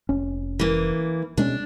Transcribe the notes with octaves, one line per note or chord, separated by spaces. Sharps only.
F1 C#4
E3 A#3
B2 G#3 C#4 D4